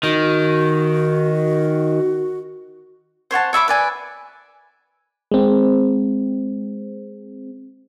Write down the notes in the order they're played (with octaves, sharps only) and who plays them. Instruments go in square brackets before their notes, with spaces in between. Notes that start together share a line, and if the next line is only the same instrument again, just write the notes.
[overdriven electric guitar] D#3 [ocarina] F#4
[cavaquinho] C5 C#5 F#5 A5
C#5 E5 B5 D6
B4 D5 G#5
[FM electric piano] G#3 C4